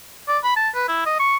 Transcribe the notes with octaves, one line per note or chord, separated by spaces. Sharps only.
D5
B5
A5
B4
E4
D#5
C#6